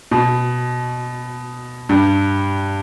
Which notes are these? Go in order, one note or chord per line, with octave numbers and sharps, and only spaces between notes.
B2
G2